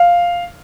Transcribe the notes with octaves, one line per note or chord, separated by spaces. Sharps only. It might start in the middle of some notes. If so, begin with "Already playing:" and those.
Already playing: F5